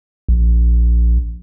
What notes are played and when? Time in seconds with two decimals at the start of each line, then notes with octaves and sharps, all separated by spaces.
0.29 A#1